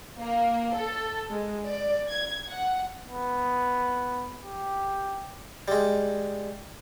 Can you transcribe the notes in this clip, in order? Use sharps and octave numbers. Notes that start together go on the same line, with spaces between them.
A#3
A4
G#3
D5
G#6
F#5
B3
G4
G3 G#3